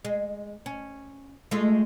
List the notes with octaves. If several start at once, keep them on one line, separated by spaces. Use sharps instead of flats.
G#3
C#4
G#3 A3 F4